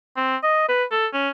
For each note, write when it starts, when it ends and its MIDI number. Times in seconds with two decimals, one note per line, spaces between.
0.17 0.36 60
0.43 0.67 75
0.69 0.84 71
0.91 1.07 69
1.13 1.29 61